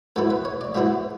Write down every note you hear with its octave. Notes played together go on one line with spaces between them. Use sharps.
G#2 F#3 B3 E4 A4
B4
C#5
D5
G#2 F#3 B3 E4 E5